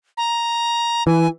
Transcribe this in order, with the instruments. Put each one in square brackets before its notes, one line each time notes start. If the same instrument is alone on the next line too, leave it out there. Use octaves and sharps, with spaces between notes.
[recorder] A#5
[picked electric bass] E3 [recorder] G#5